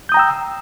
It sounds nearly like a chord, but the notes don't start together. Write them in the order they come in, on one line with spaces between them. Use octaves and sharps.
G6 D#6 A#5 G5 E6